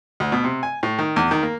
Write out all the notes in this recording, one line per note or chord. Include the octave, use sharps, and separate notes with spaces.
D2
B2
C3
G#5
A2
D#3
E2
D#3
A#3